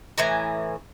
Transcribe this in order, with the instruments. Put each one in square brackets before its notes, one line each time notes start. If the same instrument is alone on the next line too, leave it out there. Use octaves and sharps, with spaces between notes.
[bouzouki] A2 E3 G#5 A#5